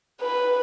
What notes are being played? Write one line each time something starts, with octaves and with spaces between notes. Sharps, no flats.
B4